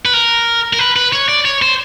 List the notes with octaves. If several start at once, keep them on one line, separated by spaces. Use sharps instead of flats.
B4
A#4
A#4
B4
B4
C#5
D5
C#5
C5